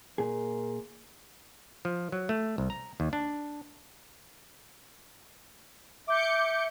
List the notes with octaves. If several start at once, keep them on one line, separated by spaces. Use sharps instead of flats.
A#2 G#4 A#4
F3
F#3
A3
C2
A#5
D#2
D4
E5 D6 G6 C#7